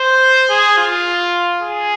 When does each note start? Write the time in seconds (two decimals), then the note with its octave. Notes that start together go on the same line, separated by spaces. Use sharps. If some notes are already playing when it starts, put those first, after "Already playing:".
Already playing: C5
0.50 G#4
0.78 F4
1.62 G#4